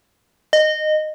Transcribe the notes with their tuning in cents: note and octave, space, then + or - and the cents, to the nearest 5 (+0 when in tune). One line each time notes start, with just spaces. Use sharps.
D#5 -20